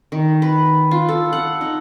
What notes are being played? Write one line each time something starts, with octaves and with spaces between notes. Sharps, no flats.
D#3
B4
F4
A4
F#5
D#4